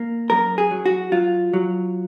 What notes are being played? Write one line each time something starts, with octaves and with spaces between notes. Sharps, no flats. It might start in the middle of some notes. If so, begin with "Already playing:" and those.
Already playing: A#3
F#2 A#4
G#4
F#3
F#4
F#3 F4
F#3